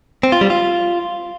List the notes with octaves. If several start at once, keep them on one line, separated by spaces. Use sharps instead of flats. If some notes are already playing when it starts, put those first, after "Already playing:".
C4
F4
G3
F4